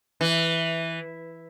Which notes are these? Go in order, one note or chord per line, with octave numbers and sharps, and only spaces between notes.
E3